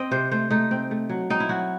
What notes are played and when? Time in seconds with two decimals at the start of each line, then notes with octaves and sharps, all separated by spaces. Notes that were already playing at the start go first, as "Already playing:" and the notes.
Already playing: C4 D#5
0.11 C3 C5
0.31 A3 C5
0.50 A3 D#4
0.71 C4
0.91 A3
1.09 F#3
1.30 C4 D#4
1.40 E4
1.49 F#3 F#4